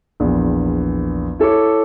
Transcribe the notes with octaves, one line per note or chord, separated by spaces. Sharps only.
A#1 E2
E4 A4 C#5 D6